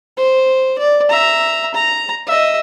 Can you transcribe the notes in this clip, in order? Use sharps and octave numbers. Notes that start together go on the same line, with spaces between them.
C5
D5
E5 A#5
A#5
D#5 E5